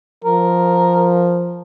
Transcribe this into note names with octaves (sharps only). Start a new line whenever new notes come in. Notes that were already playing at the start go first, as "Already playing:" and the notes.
F3 A#4